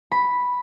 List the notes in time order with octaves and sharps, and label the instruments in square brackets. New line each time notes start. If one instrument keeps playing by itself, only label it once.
[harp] B5